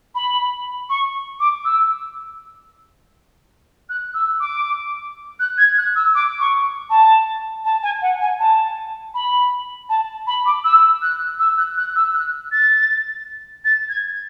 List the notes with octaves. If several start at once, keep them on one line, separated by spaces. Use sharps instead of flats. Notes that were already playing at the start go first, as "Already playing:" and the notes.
B5
C#6
D6
E6
F#6
E6
D6
F#6
G#6
F#6
E6
D6
C#6
A5
A5
G#5
F#5
G#5
A5
B5
A5
B5
D6
E6
F#6
E6
F#6
F#6
E6
F#6
A6
A6
G#6